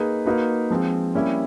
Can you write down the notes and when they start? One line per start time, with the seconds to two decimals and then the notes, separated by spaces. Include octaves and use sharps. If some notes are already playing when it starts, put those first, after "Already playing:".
Already playing: A#3 D#4 G#4 B4
0.25 A#3 D#4 F#4 B4
0.71 F3 G#3 C4
1.15 G3 A#3 C#4 E4 G4